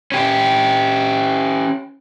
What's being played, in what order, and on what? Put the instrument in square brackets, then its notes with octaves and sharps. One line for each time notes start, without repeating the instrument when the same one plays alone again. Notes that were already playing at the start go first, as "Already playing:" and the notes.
[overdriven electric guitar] C#4 G4